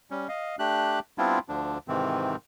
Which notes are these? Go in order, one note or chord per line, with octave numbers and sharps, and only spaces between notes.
G3 C#4
D#5 F5
A3 D4 G4 F#6
G3 B3 C4 D4 E4 F4
D2 D3 F3 D4
G#2 C3 D#3 E3 C4